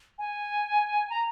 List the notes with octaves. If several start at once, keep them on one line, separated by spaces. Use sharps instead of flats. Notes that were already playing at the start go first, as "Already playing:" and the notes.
G#5
A#5